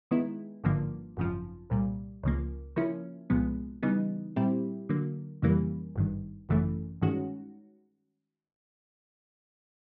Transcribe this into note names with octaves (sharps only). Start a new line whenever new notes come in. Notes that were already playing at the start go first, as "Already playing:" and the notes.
D#3 G#3 B3 E4
G#1 G2 D3 F3 A#3
G#1 F#2 C#3 F3
C2 A#2 G3
C#2 C#3 F3 A#3
C#3 F3 A#3 C#4 E4
C2 A#2 F3 G#3 B3
C#3 E3 G3 B3 D#4
A#2 G3 C4 E4 G4
D3 F#3 A#3
F2 C#3 E3 G3 A#3
G#1 G2 D#3
G#1 F#2 C#3 E3 A3
G2 D#3 G#3 C#4 F#4